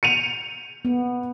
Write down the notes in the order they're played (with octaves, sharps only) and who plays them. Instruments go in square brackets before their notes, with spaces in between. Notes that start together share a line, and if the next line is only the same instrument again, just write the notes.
[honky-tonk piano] C#7 D#7 F7
[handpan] B3